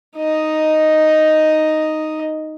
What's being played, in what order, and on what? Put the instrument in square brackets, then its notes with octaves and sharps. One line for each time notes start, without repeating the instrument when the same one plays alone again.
[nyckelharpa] D#4 D#5